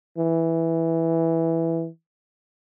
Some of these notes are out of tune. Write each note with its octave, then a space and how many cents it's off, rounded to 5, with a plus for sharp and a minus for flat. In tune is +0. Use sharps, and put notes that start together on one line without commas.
E3 -5